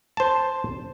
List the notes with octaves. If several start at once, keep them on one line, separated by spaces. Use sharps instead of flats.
C5 A5